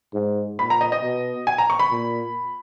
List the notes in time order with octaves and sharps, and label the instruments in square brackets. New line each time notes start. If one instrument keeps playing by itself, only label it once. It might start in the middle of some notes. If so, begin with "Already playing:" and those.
[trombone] G#2
[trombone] A#2 [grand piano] B5
[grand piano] A#5
D#5
D#5
[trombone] B2
[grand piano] G#5
A#5
C#6
B5
[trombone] A#2